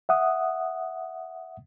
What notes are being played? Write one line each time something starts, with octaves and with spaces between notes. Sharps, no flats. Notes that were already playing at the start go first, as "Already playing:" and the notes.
E5 F#5 D#6